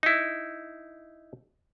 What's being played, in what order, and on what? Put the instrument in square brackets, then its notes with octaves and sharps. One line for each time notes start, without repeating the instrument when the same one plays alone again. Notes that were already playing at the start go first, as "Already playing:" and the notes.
[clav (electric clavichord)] D#4 E4